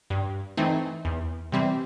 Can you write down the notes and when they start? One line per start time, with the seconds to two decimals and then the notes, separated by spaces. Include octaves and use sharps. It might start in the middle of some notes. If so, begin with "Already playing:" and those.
0.10 G2
0.57 E3 A3 C4 D#4
1.05 E2
1.52 C3 E3 G3 C4